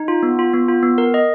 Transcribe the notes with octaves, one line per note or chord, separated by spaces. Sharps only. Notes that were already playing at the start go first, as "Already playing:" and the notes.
Already playing: D#4
F4
B3
F4
B3
F4
B3
A#4
D#5